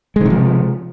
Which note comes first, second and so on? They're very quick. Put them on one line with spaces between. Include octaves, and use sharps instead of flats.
G#3 D#3 C3 F3